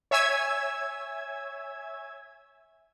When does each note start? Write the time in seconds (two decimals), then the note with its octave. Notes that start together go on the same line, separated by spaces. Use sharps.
0.11 C#5 E5 G#5 E6 G#6